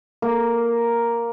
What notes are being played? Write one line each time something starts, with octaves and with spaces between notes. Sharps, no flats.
A#3